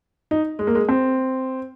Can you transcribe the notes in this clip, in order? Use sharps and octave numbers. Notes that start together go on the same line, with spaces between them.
D#4
G#3
A#3
G#3
C4